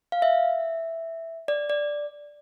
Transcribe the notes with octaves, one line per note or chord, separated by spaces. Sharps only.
F5
E5
D5
D5